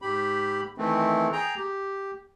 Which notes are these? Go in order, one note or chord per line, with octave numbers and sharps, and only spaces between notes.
G#2 G4 B5
D#3 E3 A3 C4
G#4 G5 A#5
G4